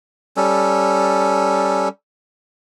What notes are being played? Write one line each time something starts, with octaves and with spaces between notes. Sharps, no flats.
G3 C#4 A4